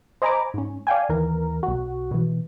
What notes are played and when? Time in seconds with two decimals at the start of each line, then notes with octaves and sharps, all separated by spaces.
0.22 C5 D#5 G#5 A#5 B5 D6
0.54 G#2 C#4
0.87 D5 F5 G5 G#5
1.09 D#2 E3 A#4
1.63 B1 F#4
2.11 B2 E3